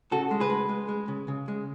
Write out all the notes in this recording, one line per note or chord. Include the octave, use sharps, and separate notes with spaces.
C#3 F#4 A4
G#3
G#4 B4
G#3
G#3
G#3
C#3
C#3
G#3